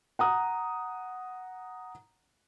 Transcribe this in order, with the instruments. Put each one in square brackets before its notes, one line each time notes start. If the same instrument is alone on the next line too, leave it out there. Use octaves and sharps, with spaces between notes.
[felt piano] F#5 A#5 D#6